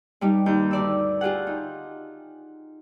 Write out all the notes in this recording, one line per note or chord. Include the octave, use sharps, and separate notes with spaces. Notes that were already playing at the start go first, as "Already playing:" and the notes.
G2 G3 D#4
D#2 D#4 G6
D2 D5 E6
F4 G4 G#4 F#5
D#4